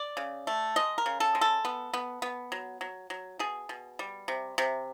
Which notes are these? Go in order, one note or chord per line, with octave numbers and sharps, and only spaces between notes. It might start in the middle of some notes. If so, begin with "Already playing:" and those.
Already playing: D5
C#3
A3
G#3 D#5
A#4
C#3
A4
G#3
A4
B3
B3
B3
F#3
F#3
F#3
B2 G#4
B2
G3
C3
C3